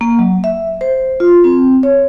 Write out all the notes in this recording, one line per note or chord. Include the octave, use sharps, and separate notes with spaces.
A#3
F#3
E5
C5
F4
C4
C#5